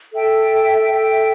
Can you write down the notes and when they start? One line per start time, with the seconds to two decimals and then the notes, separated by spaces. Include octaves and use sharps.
0.12 A4 E5 G5
0.90 A4 E5 G5